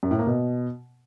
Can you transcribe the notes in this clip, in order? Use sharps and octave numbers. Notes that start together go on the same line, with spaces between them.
F#2
A2
A#3
B2